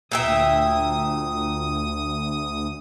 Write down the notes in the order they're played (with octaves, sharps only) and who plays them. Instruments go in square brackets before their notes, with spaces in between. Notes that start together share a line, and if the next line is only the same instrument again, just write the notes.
[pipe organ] D2 D#6 [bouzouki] A#2 E5 G5